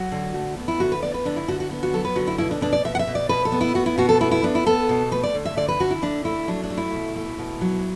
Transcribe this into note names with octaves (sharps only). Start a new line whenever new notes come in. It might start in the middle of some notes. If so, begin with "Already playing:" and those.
Already playing: F#3 F#4
D3
A3
B3
E4
D3 F#4
B4
B3 D5
B4
D3 D4
E4
D3 F#4
F#4
B3
F#4
F#3 A4
B4
D3 F#4
E4
B2 E4
D4
B2 D4
D5
B2 E5
F#5
E5
B2
D5
B2 B4
A4
B3
E4
B3 F#4
E4
B2 F#4
A4
B3 E4
E4
B3 D4
E4
B3 A4
B2
A3 B4
D5
D3
E5
D3 D5
B4
D3 F#4
E4
D3 D4
A3 E4
F#3 D4
D4
A3
E4
B2
A3
B2
F#3